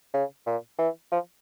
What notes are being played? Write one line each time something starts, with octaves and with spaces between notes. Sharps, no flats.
C#3
A#2
E3
F3